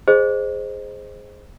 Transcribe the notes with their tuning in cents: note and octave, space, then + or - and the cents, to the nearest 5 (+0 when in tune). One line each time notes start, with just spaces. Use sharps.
G#4 +0 C5 +0 D#5 -25